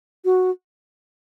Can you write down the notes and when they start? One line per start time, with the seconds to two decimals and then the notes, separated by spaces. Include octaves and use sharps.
0.25 F#4